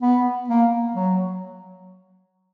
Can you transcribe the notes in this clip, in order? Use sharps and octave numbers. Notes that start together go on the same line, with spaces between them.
B3
A#3
F#3